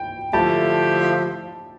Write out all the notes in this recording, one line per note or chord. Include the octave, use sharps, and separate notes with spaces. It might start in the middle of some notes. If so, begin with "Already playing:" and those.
Already playing: G5
D3 F3 A3 E4 G4 A5